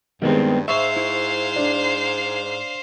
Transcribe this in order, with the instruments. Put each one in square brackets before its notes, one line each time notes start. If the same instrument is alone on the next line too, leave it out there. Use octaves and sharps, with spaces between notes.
[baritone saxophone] G2 [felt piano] D#3 G#3 [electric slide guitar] G3 B3 C4
[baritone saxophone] G#2 [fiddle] C5 F5 [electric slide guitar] E5 [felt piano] C#6
[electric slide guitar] E4
[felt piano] D4